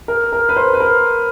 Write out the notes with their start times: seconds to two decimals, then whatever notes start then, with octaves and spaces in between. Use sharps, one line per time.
0.08 A#4
0.33 A#4
0.49 B4
0.56 C5
0.73 B4
0.80 A#4